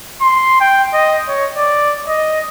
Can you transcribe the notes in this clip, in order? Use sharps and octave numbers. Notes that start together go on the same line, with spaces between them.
C6
G5
D#5
C#5
D5
D#5